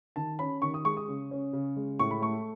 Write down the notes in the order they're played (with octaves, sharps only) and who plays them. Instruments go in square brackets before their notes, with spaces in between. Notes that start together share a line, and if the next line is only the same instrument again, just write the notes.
[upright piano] D#3 A5
C#4 B5
D#3 C#6
D#6
G#3 C#6
D#6
C#3
C#4
C#3
G#3
A2 C#6
B5
A3 C#6